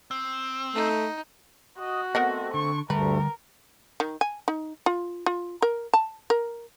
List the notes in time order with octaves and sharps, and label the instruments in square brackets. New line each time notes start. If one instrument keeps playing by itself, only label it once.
[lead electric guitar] C4
[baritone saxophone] A3 [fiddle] D#4
[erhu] F#4 [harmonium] D#5
[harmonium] A3 C4 [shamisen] B3 A#4 F#5 [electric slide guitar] D#5
[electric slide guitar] D3 [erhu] C#6
[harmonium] D2 G2 A3 [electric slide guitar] D3 G3 [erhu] A#4 [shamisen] B4
[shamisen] D#3
G#5
D#4
F4
F4
A#4
A5
A#4